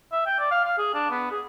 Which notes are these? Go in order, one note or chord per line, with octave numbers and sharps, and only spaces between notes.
E5
G5
D5
F5
F5
G#4
D4
B3
G#4